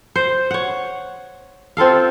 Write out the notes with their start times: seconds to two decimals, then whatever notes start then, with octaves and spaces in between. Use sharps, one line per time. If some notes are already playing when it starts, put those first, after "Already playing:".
0.16 C5
0.51 C#5 F#5
1.77 C4 F4 A4 F5